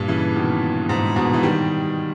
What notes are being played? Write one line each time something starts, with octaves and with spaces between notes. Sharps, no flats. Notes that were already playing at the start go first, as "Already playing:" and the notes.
Already playing: G2 A#2
C#3 E3
B2 D#3
G#2
G#2 B2
E3
D#3 G3